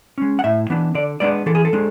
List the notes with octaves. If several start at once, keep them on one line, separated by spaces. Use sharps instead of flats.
G#3 C#4
F#5
A2 E5
E3 B3 D4
D3 D5
G#3 B3 D4 D5
E3 A4
G#4
A4
G#3 D4